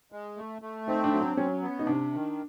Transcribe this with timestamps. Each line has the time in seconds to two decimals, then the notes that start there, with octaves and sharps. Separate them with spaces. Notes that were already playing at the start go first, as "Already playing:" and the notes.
0.12 G#3
0.37 A3
0.62 A3
0.88 C4 D#4
1.04 D4
1.12 F#3
1.21 D4
1.37 F#3 C#4
1.62 B3
1.79 D#4
1.87 C3 D4
2.13 D#3